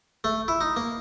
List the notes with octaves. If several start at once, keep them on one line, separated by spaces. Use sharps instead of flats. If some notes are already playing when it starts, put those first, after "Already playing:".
A3
E4
D#4
A#3